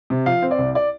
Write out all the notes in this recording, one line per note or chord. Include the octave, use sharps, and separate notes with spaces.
C3
F3 F5
C4
D5
C2
D5